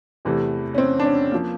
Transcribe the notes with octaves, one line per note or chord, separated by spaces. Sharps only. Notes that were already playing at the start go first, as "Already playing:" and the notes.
E2 C3 E3 A3
C#4
C4
D4
C#4
F3 A#3